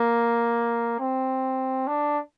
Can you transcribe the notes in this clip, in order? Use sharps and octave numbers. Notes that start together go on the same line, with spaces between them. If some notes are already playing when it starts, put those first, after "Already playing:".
Already playing: A#3
C4
D4